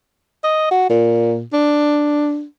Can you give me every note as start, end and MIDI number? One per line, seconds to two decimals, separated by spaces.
0.44 0.69 75
0.71 0.86 66
0.89 1.42 46
1.53 2.44 62